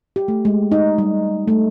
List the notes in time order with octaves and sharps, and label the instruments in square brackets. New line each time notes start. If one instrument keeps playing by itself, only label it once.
[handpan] G4
A3
G#3
D#4
G3
A3